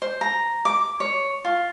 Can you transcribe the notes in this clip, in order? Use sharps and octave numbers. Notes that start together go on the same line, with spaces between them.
C5
A#5
D6
C#5
F4